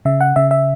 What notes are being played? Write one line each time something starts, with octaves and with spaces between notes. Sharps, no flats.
C#3 E5
F#5
C#3 E5
E5